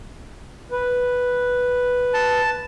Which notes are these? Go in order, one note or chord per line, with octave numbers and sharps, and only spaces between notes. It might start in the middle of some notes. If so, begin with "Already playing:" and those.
B4
A5